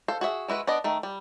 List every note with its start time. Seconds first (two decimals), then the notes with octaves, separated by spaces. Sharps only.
0.08 A4 C5 F5
0.21 F#4 G#4 E5
0.48 G#3 E4 F#4 B4
0.67 B3 D4 D5 D#5
0.84 D#3 A3
1.03 G3